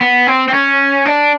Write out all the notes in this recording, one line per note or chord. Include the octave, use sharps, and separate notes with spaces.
B3
C4
C4
C#4
D4